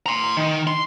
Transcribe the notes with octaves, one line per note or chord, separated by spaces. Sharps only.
A#5 C6
D#3
C6